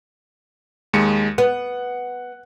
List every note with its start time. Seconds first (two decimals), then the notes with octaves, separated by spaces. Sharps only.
0.93 D#2 G#3 C#7
1.38 B3 F#5